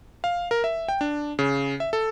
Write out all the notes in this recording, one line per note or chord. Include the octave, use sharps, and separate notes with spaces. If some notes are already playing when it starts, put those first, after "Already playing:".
F5
A#4
E5
G5
D4
C#3
E5
A4